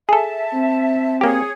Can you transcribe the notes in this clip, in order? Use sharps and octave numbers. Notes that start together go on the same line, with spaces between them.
G#4 A4 E5 A5
C4
A#3 G4 G#4 C#5